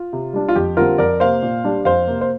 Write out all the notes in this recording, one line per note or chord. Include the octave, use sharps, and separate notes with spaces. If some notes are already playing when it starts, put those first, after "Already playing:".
Already playing: F4
C3
G3 D4
F4
F2 G4
D3 G3 C4 F4 A#4
F2 A#4 D5
C3 A#3 C5 F5
A#2
G3 D4
F2 C5 F5
C3 A#3
C5